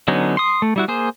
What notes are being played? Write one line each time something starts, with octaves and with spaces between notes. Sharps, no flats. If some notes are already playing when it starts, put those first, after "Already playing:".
D3 F#3 B3 C#4 D#4
C6 D#6
A3
G3 E4 F#4
A#3 G#4 C5